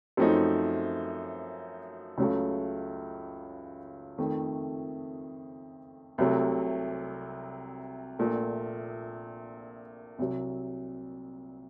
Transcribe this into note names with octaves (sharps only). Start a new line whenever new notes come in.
F#2 F3 A3 C4 D#4
C#2 C#3 F#3 A3
F2 D#3 A3
C2 C3 F#3 A3
A#1 A#2 A3
C2 C3 F#3